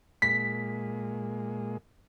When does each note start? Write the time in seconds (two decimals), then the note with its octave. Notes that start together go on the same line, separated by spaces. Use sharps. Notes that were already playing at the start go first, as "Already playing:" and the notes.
0.22 A#2 G#3 B6